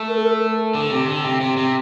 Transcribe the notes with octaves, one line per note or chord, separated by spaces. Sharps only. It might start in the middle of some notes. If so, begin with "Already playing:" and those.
Already playing: A3
A#4
A4
A#4
A4
D3
C3
D3
C3
C3
C3